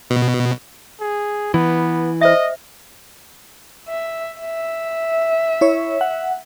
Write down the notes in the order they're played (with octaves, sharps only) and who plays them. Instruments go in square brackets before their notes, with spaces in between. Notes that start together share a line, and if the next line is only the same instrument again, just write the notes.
[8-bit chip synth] B2
[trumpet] G#4
[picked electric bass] E3 [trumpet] B3
[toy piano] C5 E5 [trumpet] D#5
[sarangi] E5
E5
[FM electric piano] E4 C#5
F#5